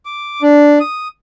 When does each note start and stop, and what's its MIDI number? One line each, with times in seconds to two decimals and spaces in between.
0.05 0.42 86
0.42 0.79 62
0.80 1.08 87